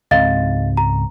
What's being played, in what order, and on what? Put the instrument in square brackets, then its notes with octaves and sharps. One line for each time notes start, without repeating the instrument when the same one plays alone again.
[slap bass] C#2 G#2 C4 [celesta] D#5 F5 A6
[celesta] A#5